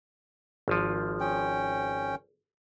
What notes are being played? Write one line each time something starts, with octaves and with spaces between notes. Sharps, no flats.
G#1 F3
C#4 G5